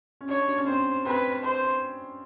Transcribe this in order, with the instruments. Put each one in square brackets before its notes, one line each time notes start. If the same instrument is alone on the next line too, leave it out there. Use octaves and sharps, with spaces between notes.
[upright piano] C#4
[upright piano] D4 [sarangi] C#5
[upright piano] D4
C#4
[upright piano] C4 [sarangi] C5
[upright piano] C4 [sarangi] B4
[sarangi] C5